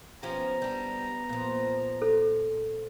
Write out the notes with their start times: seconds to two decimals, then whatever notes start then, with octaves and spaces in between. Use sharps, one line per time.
0.23 F3 B3 C#4 G4 A#5
0.62 G3 D4
1.29 A#2 F3
2.02 A4